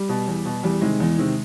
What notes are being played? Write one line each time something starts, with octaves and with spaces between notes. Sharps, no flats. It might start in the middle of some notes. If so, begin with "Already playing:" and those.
Already playing: G3
B2
E2
B2
E2 G3
C3 D#3 G#3
E2
C3 D#3